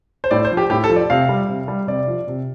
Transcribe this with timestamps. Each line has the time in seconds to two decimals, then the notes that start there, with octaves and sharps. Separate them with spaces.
0.24 C5
0.31 A2 D5
0.45 C5
0.51 F3
0.57 G4
0.70 A2 G4
0.84 A4
0.89 F3
0.96 D5
1.10 C3 F5
1.29 G3
1.49 C3
1.68 G3
1.87 C3 D5
2.07 F3
2.28 C3